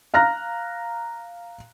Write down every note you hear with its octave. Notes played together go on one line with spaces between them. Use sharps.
F5 A#5 F6 F#6 A#6